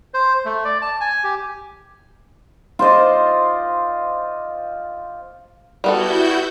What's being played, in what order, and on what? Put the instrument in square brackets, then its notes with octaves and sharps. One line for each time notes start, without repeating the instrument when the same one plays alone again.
[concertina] C5
A3
D5
A5
G#5
G4
[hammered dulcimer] F4 C5 D5 D#5
[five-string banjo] G3 B3 A4 [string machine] E4 F#4 G6